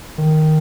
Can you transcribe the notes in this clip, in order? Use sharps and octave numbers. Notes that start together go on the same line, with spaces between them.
D#3